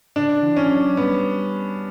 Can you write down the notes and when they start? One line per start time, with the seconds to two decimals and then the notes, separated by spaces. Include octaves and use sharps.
0.15 C#3 D4
0.42 E3
0.56 C#4
0.70 F#3
0.97 G3 B3